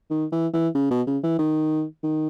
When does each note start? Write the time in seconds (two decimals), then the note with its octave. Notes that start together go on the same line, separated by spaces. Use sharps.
0.10 D#3
0.32 E3
0.53 E3
0.75 C#3
0.91 B2
1.07 C#3
1.23 E3
1.39 D#3
2.03 D#3